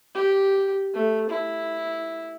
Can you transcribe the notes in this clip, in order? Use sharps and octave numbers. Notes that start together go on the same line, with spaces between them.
G4
A3
E4